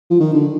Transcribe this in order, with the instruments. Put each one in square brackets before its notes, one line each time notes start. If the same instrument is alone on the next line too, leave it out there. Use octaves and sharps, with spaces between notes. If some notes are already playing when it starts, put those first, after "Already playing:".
[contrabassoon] F3
D#3
D3